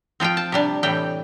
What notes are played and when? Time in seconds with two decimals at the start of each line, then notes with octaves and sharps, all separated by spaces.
0.20 F3 C4 F4 G5
0.37 A5
0.52 C3 G3 D4
0.83 A2 E3 G3 G5